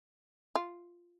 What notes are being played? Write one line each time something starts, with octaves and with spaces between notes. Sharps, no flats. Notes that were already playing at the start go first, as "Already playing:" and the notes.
F4